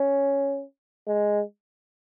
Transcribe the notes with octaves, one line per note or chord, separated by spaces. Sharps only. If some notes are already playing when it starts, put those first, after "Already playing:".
Already playing: C#4
G#3